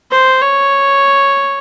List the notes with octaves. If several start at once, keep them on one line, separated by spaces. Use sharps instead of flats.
C5
C#5